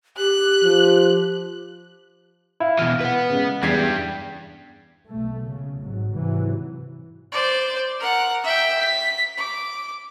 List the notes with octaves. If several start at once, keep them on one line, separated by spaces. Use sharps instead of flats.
G4 F#6
F3
E4 F5
B2 E3 F6
B4 F#5
C#3 G#3
E2 G2 G3 G#6 B6 C7
B1 A3
C#3
G#1 G#2 F#3
G#2 C3 E3 F#3
C5 D5
A#4 F#5
E5 G5
B6
D6